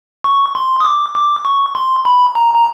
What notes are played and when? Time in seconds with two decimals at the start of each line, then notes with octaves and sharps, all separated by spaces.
0.24 C#6
0.55 C6
0.80 D#6
0.85 D6
1.15 D6
1.45 C#6
1.75 C6
2.05 B5
2.35 A#5
2.54 A#5